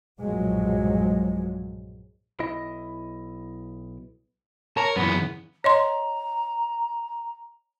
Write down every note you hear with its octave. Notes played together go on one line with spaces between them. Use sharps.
B1 G2 A#2 F3 F#3 G#3
B1 E4 D#5
A#4 C#5 A5 A#5
F#2 C#3 E3 B3
C#5 D#5 A#5 C6